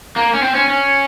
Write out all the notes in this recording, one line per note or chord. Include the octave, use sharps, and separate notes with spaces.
A#3
C#4
C4
C#4
C#4